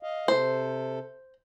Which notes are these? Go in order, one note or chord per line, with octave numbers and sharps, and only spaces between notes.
D#5 F5
C3 A4 C5